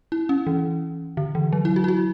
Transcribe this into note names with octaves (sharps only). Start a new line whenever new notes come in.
E4
C#4
E3
D3
E3
F#3
E4
F#4
E4
F#4